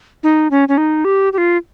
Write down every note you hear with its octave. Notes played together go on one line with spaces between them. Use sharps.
D#4
C#4
C#4
D#4
G4
G4
F4